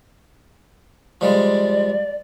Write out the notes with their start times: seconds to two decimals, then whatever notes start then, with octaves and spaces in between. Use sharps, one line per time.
1.21 F3 G3 G#3 D5